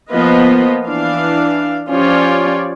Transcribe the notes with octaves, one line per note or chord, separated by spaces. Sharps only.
F3 A#3 B3 F4 B4 D#5
E3 D4 F5
F3 C#4 F4 G4 C#5 D5